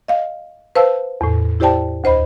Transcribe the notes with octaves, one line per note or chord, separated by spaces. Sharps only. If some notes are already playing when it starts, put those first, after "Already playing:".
D#5 F5
B4 C5 F5 A5 E6
E2 A2
E4 G4 C5 D5 G5 A5
D2 C5 D#5 B5